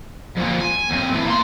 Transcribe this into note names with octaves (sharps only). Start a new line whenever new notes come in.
F2 A#2
G#5
D#2 C4
E3 A3
A#3 C6